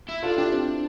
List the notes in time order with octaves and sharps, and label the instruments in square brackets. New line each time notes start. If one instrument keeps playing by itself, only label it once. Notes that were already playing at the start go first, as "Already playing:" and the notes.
[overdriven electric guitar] E4
[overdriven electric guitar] D4 [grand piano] F4 A4
[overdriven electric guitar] D4 [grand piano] E4 G4
[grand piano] C4